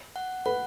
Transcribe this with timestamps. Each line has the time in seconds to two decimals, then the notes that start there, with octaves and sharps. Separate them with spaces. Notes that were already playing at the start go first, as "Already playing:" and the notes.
0.16 F#5
0.46 B4 F#5